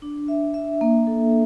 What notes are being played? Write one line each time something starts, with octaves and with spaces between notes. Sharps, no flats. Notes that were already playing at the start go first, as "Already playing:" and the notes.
D4
E5
E5
A#3
A4